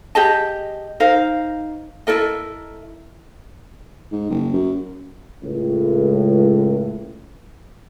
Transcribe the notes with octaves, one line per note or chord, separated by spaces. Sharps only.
G4 G#4 D#5 A5
D#4 A#4 C5 F5
E4 A4 A#4 D#5
G#2
F#1
F#2
C#2 A2